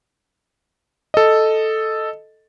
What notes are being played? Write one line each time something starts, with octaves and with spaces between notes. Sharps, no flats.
A4 D#5